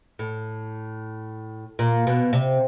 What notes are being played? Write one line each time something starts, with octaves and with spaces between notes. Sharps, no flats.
A2
A#2
B2
C3